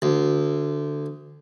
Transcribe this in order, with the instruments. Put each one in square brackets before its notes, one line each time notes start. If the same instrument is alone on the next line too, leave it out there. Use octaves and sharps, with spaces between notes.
[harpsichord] D2